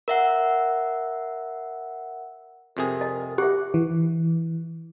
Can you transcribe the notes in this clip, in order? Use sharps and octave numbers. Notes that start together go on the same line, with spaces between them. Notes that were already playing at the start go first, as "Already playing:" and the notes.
A#4 E5 F#5
F2 C3 G#4 A#4
D#5
G4 E5 F#5 D6
E3